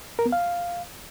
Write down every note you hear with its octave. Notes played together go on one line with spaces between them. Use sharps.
A#4
B3
F5